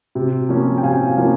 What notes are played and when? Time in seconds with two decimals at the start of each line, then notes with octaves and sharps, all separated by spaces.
0.15 C3
0.49 F3 A#3 C#4
0.78 G5
0.83 C3 F5 G#5
1.17 F3 A#3 C#4